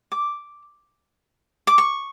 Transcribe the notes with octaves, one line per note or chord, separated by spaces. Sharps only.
D6
D6
C#6